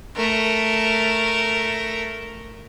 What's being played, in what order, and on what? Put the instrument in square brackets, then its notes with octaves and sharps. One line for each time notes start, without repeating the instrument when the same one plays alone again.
[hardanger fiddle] A3 A#4